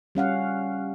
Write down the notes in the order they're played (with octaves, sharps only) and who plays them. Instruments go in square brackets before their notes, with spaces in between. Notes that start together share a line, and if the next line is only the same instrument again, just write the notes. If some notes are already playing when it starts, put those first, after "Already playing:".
[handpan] G3 C#4 F5 F#5